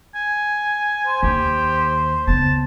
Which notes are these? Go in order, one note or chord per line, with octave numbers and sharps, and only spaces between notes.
G#5
C5
D#2 G4
C#2 B3 A5